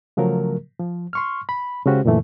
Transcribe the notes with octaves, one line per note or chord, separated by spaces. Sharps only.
C#3 F3 F#3 A3 A#4
F3
C6 C#6 F6
B5
C#3 G#3 C#4 F#4 G4 C5
F#2 A#2 D3 E3 A3